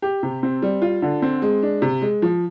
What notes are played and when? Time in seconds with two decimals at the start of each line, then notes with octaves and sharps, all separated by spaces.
0.02 G4
0.23 C3
0.43 C4
0.62 G3
0.82 F4
1.02 D3
1.22 C4
1.42 G#3
1.62 D4
1.82 C3
2.02 G#3
2.22 F3